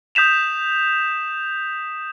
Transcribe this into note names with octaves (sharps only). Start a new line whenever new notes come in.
D#6 G6 B6 E7 F7